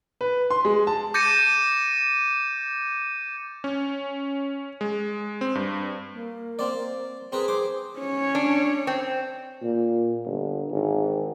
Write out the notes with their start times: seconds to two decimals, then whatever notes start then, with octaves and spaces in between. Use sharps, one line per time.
0.21 B4
0.50 C6
0.65 G#3
0.87 A5
1.14 D6 G6 A6 A#6 C#7 D#7
3.64 C#4
4.81 G#3
5.41 C4
5.55 G2
6.13 A#3
6.59 C4 D5
7.32 C4 G#4 A#4 B4
7.48 C5 D6
7.98 C#4 C#5
8.35 D4
8.87 C4
9.63 A#2
10.26 G1
10.71 G#1